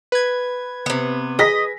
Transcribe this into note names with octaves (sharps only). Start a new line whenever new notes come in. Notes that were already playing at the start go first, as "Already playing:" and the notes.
B4 G#6
C3 B3
G#4 D#5 A#6 B6